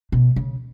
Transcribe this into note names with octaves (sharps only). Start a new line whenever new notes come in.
B2
C#3